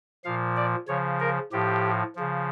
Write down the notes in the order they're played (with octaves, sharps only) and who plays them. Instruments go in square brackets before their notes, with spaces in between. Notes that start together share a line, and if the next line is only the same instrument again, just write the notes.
[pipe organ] A#2 F3 F5
D5
C#3 F3 C#5
A#4
A2 F3 G4
C#3 F3